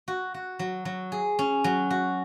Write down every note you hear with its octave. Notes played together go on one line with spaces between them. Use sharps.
F#4
F#4
F#3
F#3
G#4
C#4
F#3
F#4